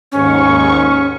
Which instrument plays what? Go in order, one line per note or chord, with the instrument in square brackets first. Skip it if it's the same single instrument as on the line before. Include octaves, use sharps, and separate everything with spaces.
[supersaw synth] D#2 G#2 C#6 [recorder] C#4